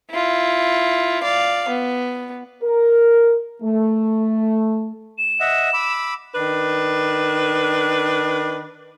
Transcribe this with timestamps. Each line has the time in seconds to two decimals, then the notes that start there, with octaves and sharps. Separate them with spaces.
0.11 E4 F4
1.23 D5 F5
1.69 B3
2.62 A#4
3.62 A3
5.18 E7
5.40 D#5 E5 F#5
5.74 B5 D6 E6
6.35 D#3 D4 B4